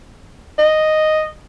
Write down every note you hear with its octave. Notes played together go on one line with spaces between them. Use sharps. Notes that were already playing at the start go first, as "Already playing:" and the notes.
D#5